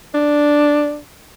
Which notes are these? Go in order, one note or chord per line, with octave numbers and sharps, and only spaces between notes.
D4